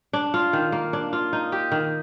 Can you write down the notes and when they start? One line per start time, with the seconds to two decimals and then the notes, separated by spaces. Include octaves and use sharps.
0.13 D4
0.34 F4
0.53 D#3
0.72 A#3
0.93 D4
1.13 F4
1.33 D#4
1.52 G4
1.72 D#3